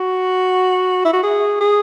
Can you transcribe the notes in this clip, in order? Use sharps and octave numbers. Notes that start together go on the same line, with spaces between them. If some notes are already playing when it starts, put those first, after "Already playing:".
Already playing: F#4
E4
F#4
G#4
G#4